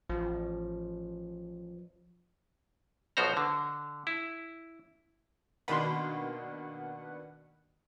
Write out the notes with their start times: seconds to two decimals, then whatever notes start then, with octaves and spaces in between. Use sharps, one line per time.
0.09 A1 F3
3.17 B1 B2 F3 F#4 C5 A#5
3.37 D3
4.07 E4
5.68 B2 D#3 A#3 D4 B4 F#5 B5 C6